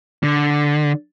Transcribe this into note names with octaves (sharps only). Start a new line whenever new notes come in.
D3